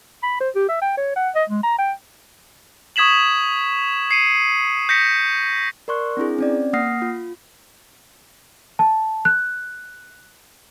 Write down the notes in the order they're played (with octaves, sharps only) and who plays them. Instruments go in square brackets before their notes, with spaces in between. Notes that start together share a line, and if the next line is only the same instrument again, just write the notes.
[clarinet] B5
C5
G4
E5
G5
C#5
F#5
D#5
G#3
A#5
G5
[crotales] C#6 D#6 G#6 B6 E7 F#7
C7 C#7 D#7
G6 A#6 B6 C#7
[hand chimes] A#4 D5 C6 C#6 F#6
C4 D4 E4 G#4
C4 C#4 D5
A#3 F#5 D#6 F6 A#6 C7
F4
[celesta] A5
F#6